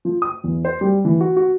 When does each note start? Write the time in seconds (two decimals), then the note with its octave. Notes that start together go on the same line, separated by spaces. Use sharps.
0.05 F3
0.22 D#6
0.44 E2
0.65 C5
0.81 G3
1.05 E3
1.20 F#4
1.37 F#4